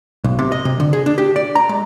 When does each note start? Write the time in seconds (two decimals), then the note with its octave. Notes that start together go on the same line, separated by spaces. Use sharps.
0.24 B1
0.39 C3
0.52 D#5
0.65 C3
0.80 D3
0.93 G#4
1.06 D4
1.18 G4
1.36 D5
1.55 A#5
1.69 G#3